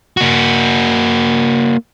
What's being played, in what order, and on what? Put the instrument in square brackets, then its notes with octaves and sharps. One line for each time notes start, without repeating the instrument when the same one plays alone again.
[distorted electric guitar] A#3 F#4